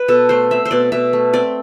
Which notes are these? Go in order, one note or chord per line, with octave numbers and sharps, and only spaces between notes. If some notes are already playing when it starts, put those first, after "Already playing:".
Already playing: B4
B2 A4
A3 C5
C4 E5
C5
B2 D5
B2 E5
A3
C4 D5